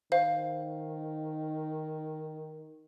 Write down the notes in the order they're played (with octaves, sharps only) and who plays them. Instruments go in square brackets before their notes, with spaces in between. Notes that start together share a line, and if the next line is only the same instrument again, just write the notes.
[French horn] D#3 [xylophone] C5 F5